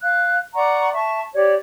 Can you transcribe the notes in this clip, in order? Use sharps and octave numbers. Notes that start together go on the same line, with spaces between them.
F5 F#6
D5 F#5 A#5 C#6
E5 A5 C#6
G4 C#5 D5